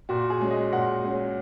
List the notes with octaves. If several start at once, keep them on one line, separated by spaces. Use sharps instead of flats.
A#2 F#4
G#4
G#3 C#4
D#5
A#2 F#5
G#3 C#4